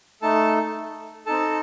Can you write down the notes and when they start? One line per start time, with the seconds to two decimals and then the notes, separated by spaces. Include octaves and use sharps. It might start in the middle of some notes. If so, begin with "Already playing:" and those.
0.22 A3 D#4 A4 A5
1.26 C4 D#4 A4 A5